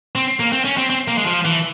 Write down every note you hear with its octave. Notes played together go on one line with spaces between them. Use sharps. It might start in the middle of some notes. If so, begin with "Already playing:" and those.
C4
A#3
C4
C#4
C4
C4
A#3
G#3
F3
E3